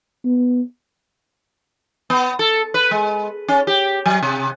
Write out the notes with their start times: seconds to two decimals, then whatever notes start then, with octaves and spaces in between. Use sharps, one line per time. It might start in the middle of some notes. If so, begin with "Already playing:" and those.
0.25 B3
2.10 B3
2.39 A4
2.74 B4
2.91 G#3
3.48 C#4
3.67 G4
4.06 F#3
4.23 C3